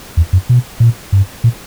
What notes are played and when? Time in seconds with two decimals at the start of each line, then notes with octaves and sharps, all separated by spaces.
0.17 E2
0.33 F#2
0.49 B2
0.80 A#2
1.12 G2
1.44 A#2